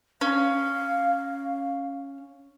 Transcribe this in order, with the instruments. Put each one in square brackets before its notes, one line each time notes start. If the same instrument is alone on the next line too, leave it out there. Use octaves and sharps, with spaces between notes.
[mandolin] C#4 [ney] F5